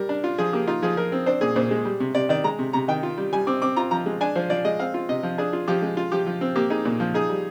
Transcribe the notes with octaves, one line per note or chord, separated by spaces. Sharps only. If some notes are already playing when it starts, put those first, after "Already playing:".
Already playing: G3 A#4
D4
F4
F3 G#4
A#3 G4
D#4 F4
F3 G#4
F3 A#4
C4
D4 C5
A#2 G#4
A#2 C5
G#3
G3
C3
C3 D5
D#3 D5
G#3 A#5
C3
C3 A#5
D#3 G5
F4
G3
G3 G#5
C4 D6
C4 D6
F4 A#5
F3 A#5
G#3
D4 G#5
F3 C5
F3 D5
G#3 D#5
C4 F5
F4
C3 D#5
F3
D4 G#4
F4
F3 G4
G#3
F4
F3 G4
F3
C4
A#3 G4
D#4 G#4
A#2
F3
D#4 G#4
G3